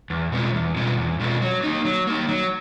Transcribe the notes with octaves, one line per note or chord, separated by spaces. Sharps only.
E2
B2 G#3 C#4 F4
E2
B2 G#3 C#4 F4
E2
B2 G#3 C#4 F4
F#3
A#3 D#4
F#3
A#3 D#4
F#3